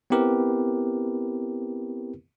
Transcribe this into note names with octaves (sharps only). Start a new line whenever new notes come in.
B3 C4 E4 G4 A#4 B4